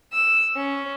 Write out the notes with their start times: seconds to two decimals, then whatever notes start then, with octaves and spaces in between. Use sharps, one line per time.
0.12 E6
0.55 C#4